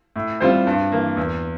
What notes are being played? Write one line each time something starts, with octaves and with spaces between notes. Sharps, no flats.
A2
G3 C4 F4 C5
G2
E3 A#3
E2